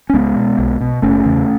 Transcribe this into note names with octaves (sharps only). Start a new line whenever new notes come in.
C#4
C#2 G#3 B3
B2
B1
B2
F#1 A3 C#4
E2 C#3